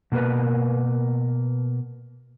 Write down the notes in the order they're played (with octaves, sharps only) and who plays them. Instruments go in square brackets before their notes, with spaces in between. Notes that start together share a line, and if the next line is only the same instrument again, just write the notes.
[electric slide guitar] B2 A#3 F#4 A#4 B4